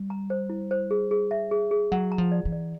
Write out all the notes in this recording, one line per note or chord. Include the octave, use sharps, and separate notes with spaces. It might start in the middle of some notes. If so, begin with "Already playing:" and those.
Already playing: G3
A#5
C5
E4
C5
G#4
G#4
E5
G#4
G#4
F#3 F#5
A#5
F3
D5
E3
D5